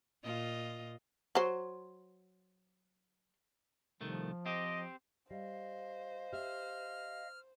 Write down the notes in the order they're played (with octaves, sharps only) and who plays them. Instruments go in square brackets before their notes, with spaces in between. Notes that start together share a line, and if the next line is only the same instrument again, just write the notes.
[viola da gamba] A#2 F4 D#5
[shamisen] F#3 C5
[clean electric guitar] C2 D#3 A3 [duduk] F3
[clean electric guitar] C4 G4 [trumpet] D#5
[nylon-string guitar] G3 [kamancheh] C5 [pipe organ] D#5 F5
[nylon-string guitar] G4 E5 [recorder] F6